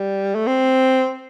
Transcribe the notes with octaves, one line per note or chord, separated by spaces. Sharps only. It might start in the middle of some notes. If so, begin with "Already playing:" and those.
Already playing: G3
A3
C4